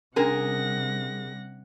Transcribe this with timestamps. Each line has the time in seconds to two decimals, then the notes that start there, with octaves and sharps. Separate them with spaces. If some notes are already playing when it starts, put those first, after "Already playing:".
0.16 C3 G3 C#4 D4 G#4 A#4 F#5 A#6